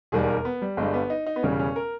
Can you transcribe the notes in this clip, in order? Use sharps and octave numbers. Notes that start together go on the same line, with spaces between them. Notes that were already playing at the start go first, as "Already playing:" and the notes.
E1 D#2 D#3 G3 G#4
A#4
B3
G3
G1 G2 G3 G#3
B3
D#4
D#4
B3
E1 E2 C#3 G3 C#4
C#4
A#4